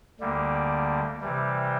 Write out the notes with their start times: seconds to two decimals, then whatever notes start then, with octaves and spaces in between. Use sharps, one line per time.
0.20 D2 D3 G3 A#3
1.21 C3 E3 G3